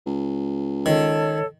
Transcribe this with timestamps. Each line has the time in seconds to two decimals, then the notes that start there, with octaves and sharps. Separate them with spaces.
0.06 C#2
0.86 D#3 A4 C#5